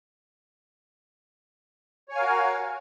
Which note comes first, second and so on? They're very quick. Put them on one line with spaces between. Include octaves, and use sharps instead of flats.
C#5 G#5 F5 A#4 F#4